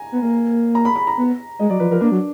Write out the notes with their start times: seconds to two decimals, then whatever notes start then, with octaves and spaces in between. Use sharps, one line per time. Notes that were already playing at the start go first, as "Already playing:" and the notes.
Already playing: G#5 A#5
0.12 B3
0.22 A#3
0.75 A#5
0.85 B5
0.96 B5
1.07 A#5
1.17 B3
1.59 G#3 D#5
1.70 F#3 D5
1.80 F3 B4
1.90 F3 A#4
2.01 A#3 D4
2.12 F#3